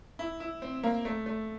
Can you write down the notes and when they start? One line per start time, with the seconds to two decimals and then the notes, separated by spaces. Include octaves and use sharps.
0.19 E4
0.40 E4
0.62 C4
0.83 A#3
1.05 A3
1.26 A3